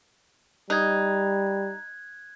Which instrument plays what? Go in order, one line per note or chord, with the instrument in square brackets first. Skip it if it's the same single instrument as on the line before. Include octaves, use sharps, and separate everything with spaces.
[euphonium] G3 [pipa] D#4 [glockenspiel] F#6 G#6